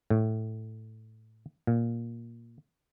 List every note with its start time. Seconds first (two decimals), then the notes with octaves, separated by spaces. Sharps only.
0.10 A2
1.67 A#2